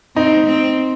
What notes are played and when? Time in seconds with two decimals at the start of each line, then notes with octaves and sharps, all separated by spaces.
0.16 C4 D#4
0.46 C4